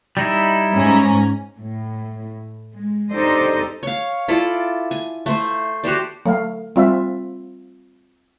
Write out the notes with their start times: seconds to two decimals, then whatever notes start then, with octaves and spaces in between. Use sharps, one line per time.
0.17 G3 D#4 E4
0.73 G#2 C#4 A#5
1.57 A2
2.73 G#3
3.12 D4 D#4 G4 A4 C5 D#5
3.83 C#5 F5
4.28 E4 F4 A4 D5
4.91 G#5
5.26 A3 C5
5.84 F#4 G4 C5 D5
6.26 F#3 A3 F5
6.76 G3 C4 F4 E5